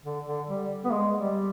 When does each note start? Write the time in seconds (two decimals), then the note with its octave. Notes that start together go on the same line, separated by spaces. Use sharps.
0.04 D3
0.27 D3
0.48 G3
0.85 B3
0.92 G#3
1.14 G3